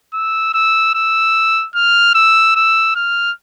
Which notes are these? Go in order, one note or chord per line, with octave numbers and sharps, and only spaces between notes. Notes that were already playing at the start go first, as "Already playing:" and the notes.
E6
E6
E6
F6
E6
E6
F6